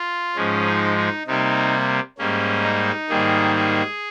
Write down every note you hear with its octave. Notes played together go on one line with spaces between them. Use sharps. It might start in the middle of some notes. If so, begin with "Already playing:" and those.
Already playing: F4
G#2 F3 G#3 C#4
D#4
D#4
C3 G3 A#3 D#4
G#2 G3 A#3 C#4
D#4
G#2 D#3 G3 A#3 G#4
G#4